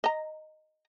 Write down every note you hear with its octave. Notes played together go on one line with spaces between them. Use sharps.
D#5 A#5